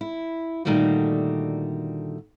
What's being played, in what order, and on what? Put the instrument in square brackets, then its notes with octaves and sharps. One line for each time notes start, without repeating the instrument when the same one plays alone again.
[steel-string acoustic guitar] E4
A#2 D3 D#3 G3 A3 F#4